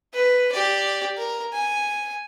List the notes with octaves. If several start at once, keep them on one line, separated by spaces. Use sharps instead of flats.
B4
G4 D5
A#4
G#5